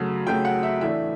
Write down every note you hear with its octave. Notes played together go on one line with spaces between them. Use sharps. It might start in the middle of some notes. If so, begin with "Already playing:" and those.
Already playing: F#2 C#3 F#3 A3
F#2 C#3 F#3 A3 G5
F#5
E5
A2 E3 A3 D4 E5